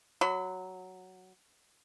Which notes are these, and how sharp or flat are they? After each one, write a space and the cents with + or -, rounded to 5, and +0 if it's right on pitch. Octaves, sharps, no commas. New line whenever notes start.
F#3 +0 B5 +30